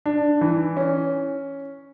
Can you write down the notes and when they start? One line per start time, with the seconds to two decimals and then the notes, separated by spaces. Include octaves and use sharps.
0.06 D4
0.41 E3
0.77 C#4